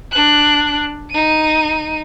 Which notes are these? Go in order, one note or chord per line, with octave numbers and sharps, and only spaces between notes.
D4 F#6
D#4 D#7